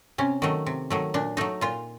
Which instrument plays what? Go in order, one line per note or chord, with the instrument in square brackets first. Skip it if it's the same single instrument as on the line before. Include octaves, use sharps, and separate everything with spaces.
[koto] C3 C#4
D#3 F#3 A3
C3
D#3 F#3 A3
A#2 D4
F#3 A3 D#4
A#2 F4